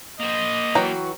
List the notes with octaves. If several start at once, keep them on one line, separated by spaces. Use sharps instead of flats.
A#3 C5 D#5
E3 F#3 F#4 G5 A#5